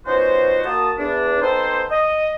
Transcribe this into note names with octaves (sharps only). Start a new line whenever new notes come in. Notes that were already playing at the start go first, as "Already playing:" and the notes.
F3 B3 C#4 D#4 F#4 C5
A#3 F#4 A5 D#6
E2 D4
B3 C4 D#4 A4 C5
D#5